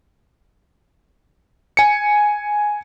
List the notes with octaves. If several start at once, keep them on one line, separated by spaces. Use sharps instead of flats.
G#5 C#7